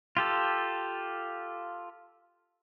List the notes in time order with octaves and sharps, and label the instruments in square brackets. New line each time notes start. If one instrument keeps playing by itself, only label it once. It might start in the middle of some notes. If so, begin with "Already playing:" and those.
[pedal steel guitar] F4 G4 A4